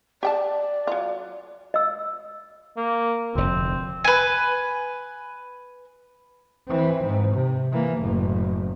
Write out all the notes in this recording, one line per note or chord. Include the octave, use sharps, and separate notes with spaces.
G4 D5 G5 A5
F#3 F4
D#5 E6
A#3
F1 D2 C4
B4 G#5
E3 C4
G#2
C3
E3 A#3
F#1 A2